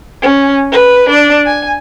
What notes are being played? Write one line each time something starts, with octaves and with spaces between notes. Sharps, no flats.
C#4
B4
D4
G#5